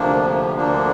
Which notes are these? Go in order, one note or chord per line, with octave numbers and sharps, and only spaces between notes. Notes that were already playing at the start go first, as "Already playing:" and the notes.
Already playing: D2 C3 F3 A#3 D4
D2 D3 F3 A#3 D4